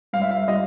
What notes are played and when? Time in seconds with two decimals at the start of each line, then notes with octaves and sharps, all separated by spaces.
0.13 G2 F5
0.22 E5
0.31 F5
0.48 G3 D#5